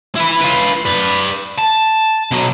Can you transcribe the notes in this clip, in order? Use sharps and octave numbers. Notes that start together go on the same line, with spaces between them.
E4 B4
F4 B4
B4 D5
A5
B2 F#3